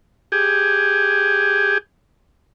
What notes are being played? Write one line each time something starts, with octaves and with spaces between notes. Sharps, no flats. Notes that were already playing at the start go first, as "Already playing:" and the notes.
G4 G#4